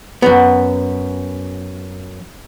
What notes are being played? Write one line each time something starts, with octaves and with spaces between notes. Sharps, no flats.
F#2 B3